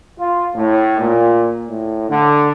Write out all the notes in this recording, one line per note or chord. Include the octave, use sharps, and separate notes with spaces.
F4
A2
A#2
A2
D3